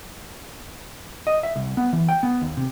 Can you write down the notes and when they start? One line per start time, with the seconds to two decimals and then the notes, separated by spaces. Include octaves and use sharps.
1.27 D#5
1.43 E5
1.56 C2
1.77 B3
1.93 E3
2.09 G5
2.23 B3
2.41 D#2
2.57 C3